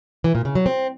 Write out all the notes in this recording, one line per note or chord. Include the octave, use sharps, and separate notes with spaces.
E3
A#2
C#3
F#3
C4